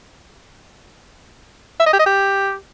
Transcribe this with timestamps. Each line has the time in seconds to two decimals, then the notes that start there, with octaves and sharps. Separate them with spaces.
1.80 E5
1.86 D#5
1.93 G4
1.99 D#5
2.06 G4